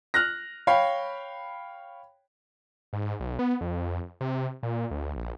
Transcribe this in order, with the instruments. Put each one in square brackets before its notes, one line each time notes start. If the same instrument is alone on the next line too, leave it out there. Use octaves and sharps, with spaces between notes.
[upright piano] F6 F#6 A#6
C#5 F5 G5 B5
[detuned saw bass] G#2
B1
B3
F2
C3
A#2
D2
A#1